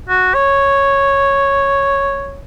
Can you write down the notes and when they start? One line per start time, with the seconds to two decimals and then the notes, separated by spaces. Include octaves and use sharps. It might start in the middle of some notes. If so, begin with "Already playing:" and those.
0.09 F#4
0.34 C#5